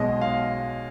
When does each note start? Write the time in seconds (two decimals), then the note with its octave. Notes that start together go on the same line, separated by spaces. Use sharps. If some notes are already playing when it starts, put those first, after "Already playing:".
Already playing: B1 B2 G#3 D#5
0.21 F5